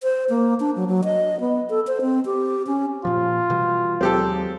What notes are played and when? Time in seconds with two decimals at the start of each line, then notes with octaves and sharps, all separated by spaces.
0.03 C5
0.30 A#3
0.60 D4
0.76 F#3
0.88 F#3
1.04 D#5
1.40 B3
1.70 A4
1.87 C5
2.01 C4
2.26 G4
2.67 C#4
3.05 A#2 F3 F4
3.50 B2 E3 G3
4.01 D#2 F#3 G#3 C4 G4 A4